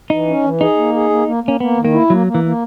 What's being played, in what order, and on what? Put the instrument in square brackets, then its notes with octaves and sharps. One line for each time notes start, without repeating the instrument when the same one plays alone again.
[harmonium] E3 [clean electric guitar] D#4
[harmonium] C#4
E3
[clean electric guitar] D#4 [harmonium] G#4
[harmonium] A#3
G#4
A#3
A#3
[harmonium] A#3 [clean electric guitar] C#4
[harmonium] A#3 [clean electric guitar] B3
[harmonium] D#3
[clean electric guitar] A#3
[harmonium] E4
[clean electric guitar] F#3 [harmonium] A#3
[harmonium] A#3
[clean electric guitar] E3
[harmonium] A#3